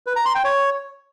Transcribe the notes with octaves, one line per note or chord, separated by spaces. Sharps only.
B4
A#5
C6
G5
C#5